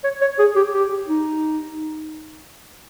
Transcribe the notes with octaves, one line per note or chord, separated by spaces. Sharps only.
C#5
C#5
G#4
G4
G4
D#4